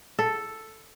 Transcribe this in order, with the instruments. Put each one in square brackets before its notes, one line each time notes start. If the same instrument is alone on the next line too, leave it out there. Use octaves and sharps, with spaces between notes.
[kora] A4